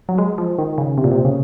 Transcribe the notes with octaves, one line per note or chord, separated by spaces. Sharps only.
F#3
G#3
F3
D#3
C#3
C3
A#2
C3
C#3